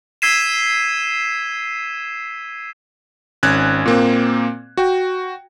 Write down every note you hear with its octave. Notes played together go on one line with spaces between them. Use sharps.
E6 G#6 B6 C7 D#7 E7
G#1 C#4 F#6 G#6
A#2 A#3 C4
F#4 G5